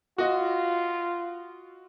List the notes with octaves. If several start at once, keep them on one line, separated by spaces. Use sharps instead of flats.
F4 F#4 D#5